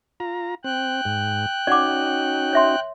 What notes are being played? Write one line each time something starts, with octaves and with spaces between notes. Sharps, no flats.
F4 A#5
C4 G5 F#6
G#2
C#4 D#4 F#4 D5 F#5 D6
C#5 E5 C6